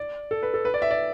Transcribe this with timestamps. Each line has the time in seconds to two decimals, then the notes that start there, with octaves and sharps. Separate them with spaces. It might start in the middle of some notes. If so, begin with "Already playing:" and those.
Already playing: D5
0.31 A4
0.43 B4
0.54 A4
0.65 B4
0.74 D5
0.82 E5
0.91 D5